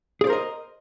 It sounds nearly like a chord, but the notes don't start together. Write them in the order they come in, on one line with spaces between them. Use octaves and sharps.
G#4 D5 C5 A#4 D#5